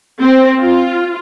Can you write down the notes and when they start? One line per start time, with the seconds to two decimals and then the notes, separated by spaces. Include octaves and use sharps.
0.20 C4
0.62 F4